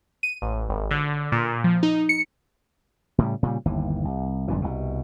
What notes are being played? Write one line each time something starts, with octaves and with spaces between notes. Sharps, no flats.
D#7
A1
G#1
D3
A#2
F3
D#4
C#7
A2 C#3 F3 G3
A#2 C#3 G3
G1 D#2 E3
C2
G1 F#2 A#2 E3
C2 B2